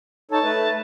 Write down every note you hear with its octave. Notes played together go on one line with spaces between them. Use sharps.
D#4 A4 C#5 A5
A3 B4